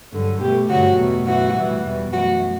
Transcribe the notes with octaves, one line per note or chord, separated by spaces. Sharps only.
G2 D3 F#3
B2 A3 G4
G2 D3 F#3 A3 F#4
E2 B2 A3
F#2 E3 A3 F#4
A2 E3 G3
E2 B2 G3
F#2 E3 A3 F#4